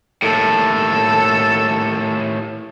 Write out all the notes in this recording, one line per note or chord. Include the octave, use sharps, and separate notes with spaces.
D#2 A2 A4